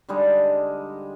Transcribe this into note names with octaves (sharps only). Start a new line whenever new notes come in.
D3 G3 G#3 D#4